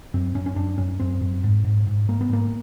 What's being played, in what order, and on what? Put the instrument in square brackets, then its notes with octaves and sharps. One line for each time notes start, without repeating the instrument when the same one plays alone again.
[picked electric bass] F#2 C4
F#2 C#4
C#4
F#2 D4
F#2 C#4
F#2 C4
F#2
G#2
G#2
G#2
G#2 A#3
B3
G#2 A#3